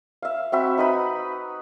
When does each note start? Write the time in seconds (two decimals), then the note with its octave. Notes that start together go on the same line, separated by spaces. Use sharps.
0.22 E5 F5
0.52 C4 F#4 E5 B5
0.78 D#4 B4 B5